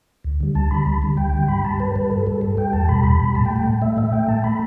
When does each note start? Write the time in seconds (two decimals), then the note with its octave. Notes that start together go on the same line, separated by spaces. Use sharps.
0.24 D2
0.41 D3 G3
0.55 D2 A5
0.71 D3 G3 B5
0.86 D2
1.02 D3 G3
1.17 D2 G5
1.33 D3 G3
1.48 G2 B5
1.64 G3 A5
1.80 G2 B4
1.95 G3 B4
2.11 G2 A4
2.27 G3 A4
2.41 G2 A4
2.57 G3 G5
2.73 E2 A5
2.89 B2 G3 B5
3.03 E2 B5
3.20 B2 G3
3.35 A2 A5
3.46 G5
3.50 A3
3.56 G5
3.67 A2
3.82 A3 E5
3.97 A2 E5
4.13 A3 G5
4.28 A2 A5
4.44 A3 B5